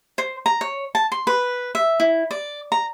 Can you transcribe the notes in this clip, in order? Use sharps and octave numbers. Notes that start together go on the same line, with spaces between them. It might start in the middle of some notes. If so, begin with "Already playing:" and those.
C5
A#5
C#5
A5
C6
B4
E5
E4
D5
A#5